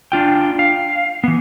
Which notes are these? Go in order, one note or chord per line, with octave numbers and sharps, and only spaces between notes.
D4 F4 G5
F5
E3 B3